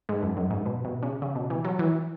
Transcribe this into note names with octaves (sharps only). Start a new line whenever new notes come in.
G#2
F#2
F#2
G#2
B2
B2
C#3
C#3
B2
E3
F#3
E3